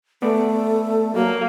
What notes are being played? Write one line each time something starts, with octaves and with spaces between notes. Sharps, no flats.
A3 B3 D5
F#3 A#3